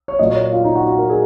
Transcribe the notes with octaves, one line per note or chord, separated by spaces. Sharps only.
C#5
A#2 F#3 A#3 D#5
C#5
C#5
F4
D#4
F#4
F#4
A#4
G#4